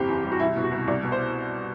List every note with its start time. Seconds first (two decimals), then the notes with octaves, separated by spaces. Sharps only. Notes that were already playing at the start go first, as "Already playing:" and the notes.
Already playing: F#1 C4 G4
0.08 E2
0.24 G3
0.32 F#4
0.40 C2 E4
0.56 B2
0.63 F#4
0.71 C2
0.87 C2 D5
1.03 B2
1.12 C5